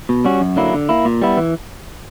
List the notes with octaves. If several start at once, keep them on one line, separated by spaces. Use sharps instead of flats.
B2
G3 C#4 F#4
F#2
D3 F#3 A#3 E4
D3
A#3 E4
A#2
G3 B3 E4
E3